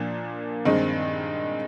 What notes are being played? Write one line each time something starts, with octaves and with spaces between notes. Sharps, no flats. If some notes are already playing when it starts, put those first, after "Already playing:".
Already playing: A#2 F3 A#3 D4
G2 D#3 G#3 C4 D#4